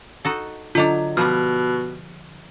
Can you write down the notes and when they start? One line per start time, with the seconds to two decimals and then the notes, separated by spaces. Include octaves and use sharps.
0.25 D#4 F#4 A4
0.75 D3 F#3 D4 F4 D#5
1.17 B2 F3 G3 F6